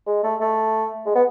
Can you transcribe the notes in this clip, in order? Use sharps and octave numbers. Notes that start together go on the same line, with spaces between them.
G#3
A3
A3
G#3
B3